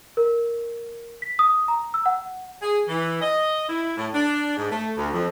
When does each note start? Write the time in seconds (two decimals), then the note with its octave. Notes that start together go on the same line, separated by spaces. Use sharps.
0.17 A#4
1.22 B6
1.39 D#6
1.68 A#5
1.94 E6
2.06 F#5
2.62 G#4
2.88 E3
3.22 D#5
3.69 E4
3.97 A2
4.14 D4
4.57 G#2
4.71 A3
4.97 D2
5.13 F2